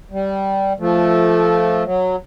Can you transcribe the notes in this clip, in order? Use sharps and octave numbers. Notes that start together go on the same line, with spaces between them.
G3
F3 A3
F#3